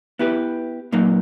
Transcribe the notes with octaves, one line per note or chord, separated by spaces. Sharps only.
B3 E4 G4 B4
A#2 F#3 A#3 D#4